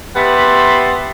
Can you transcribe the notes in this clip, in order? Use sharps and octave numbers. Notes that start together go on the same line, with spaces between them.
B3 G4 E5 A5 B5 C6